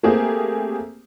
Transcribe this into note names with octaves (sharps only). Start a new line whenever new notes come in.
A3 A#3 C4 G4 G#4 C5